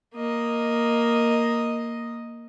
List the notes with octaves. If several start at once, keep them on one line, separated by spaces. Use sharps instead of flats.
A#3 D#5